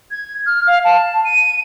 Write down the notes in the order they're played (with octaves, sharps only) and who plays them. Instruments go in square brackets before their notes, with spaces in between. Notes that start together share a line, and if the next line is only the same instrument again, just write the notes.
[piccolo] G#6
F6
F5
A5
D#7